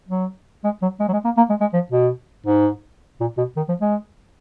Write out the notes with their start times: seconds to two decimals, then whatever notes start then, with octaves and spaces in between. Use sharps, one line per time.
0.09 F#3
0.64 G#3
0.82 F#3
1.00 G#3
1.09 F#3
1.13 G#3
1.25 A#3
1.37 A#3
1.50 G#3
1.61 G#3
1.73 F3
1.92 B2
2.47 G#2
3.20 A#2
3.38 B2
3.57 D#3
3.69 F3
3.81 G#3